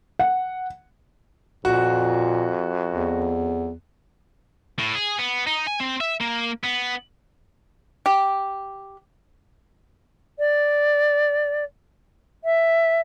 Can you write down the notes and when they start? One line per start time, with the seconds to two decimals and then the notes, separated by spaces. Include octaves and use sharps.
0.19 F#5
1.65 F2 A#2 F#4
2.93 E2
4.79 A2
4.95 G#4
5.19 B3
5.47 D#4
5.67 G#5
5.80 C4
6.01 E5
6.21 A#3
6.64 B3
8.06 G4
10.39 D5
12.44 E5